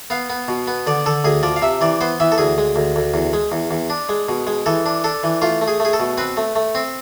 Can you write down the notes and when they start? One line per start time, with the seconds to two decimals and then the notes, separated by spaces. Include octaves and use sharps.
0.10 B3 F5
0.30 B3
0.48 B2
0.68 B3
0.87 D3 D5
1.06 D3 A4
1.24 D2 G#4
1.43 F3 D5
1.56 F5
1.62 C3 E5
1.81 E3 D5
2.01 B3 C5
2.20 E3 E5
2.32 A4
2.38 D2 G#4
2.58 G#3
2.76 D2
2.96 D2
3.14 E2
3.33 G#3
3.52 E2
3.71 E2
3.90 D4
4.09 G#3
4.29 B2
4.47 G#3
4.66 E3 A4
4.86 D4
5.04 D4 A4
5.23 E3
5.42 A3 F4
5.61 A3
5.68 G#4
5.80 A3
5.85 G#4
5.93 A4
6.00 B2
6.18 C4 B4
6.37 A3
6.56 A3
6.75 C4